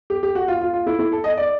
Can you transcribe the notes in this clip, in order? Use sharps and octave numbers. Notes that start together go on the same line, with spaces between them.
G4
G4
F#4
F4
F4
F4
E4
E4
A4
D#5
D5